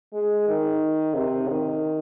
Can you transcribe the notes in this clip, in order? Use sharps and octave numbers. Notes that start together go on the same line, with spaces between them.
G#3
D#3
C3
D#3